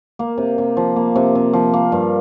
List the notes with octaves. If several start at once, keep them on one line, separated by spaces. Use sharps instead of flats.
A#3
C3
C3
F3
A#3
C3
C3
F3
A#3
G2